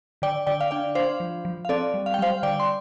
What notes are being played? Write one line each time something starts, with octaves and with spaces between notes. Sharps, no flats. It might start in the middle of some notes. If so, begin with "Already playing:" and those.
D3 D5 G5
D3 D5 G5
F5
D4 D5 G5
D4 C5 F5
F3
F3
F5
C4 A4 D5
G3
F5
G5
G3 C5 F5
D3 D5 G5
C6